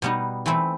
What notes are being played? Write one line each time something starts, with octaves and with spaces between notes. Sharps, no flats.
B2 G3 B3 D#4
E3 A3 C4 E4